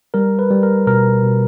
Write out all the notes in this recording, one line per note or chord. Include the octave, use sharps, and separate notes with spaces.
G3 A#4
B4
G3
A#4
B2 A#4
B2